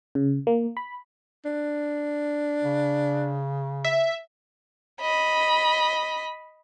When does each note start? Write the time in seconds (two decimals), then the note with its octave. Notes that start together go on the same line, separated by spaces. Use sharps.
0.15 C#3
0.47 A#3
0.77 B5
1.45 D4
2.64 C#3
3.84 E5
5.01 D#5 B5